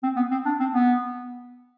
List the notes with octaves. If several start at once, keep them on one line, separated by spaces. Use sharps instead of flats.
C4
B3
C4
D4
C4
B3